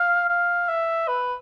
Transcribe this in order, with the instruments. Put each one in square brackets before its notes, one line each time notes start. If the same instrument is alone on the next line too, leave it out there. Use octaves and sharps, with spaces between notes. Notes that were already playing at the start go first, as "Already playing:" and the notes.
Already playing: [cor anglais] F5
F5
E5
B4